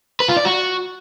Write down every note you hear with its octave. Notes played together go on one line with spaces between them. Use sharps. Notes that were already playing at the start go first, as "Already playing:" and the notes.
B4
F4
D5
F#4